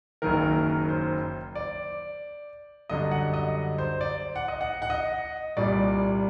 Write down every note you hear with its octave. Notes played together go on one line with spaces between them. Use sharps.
F#1 F#2 D#3 A#4
C5
D5
F#2 D3 G3 D#5
F#5
D#5
C5
D5
F#5
D#5
F#5
F#5
D#5
C2 A#2 G3 D5